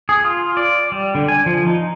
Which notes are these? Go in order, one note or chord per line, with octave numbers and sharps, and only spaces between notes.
G#4
F4
D5
G3
D3
G#5
F3
D#4